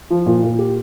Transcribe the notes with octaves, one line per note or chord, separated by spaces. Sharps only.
F3
A#2
A#2
G4